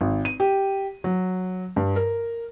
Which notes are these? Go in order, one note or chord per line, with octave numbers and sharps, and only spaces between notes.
G#1
D#7
G4
F#3
G2
A#4